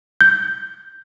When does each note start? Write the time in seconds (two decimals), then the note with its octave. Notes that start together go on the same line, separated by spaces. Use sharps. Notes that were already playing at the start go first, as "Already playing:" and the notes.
0.21 G6